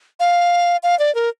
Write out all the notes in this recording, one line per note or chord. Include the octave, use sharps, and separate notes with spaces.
F5
F5
D5
A#4